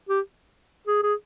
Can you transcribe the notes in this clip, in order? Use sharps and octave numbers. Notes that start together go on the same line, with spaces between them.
G4
G#4
G#4